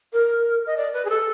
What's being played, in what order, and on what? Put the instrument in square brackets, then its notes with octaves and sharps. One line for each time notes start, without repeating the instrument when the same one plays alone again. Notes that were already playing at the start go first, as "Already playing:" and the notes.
[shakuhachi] A#4
D#5
D5
B4
G#4
A4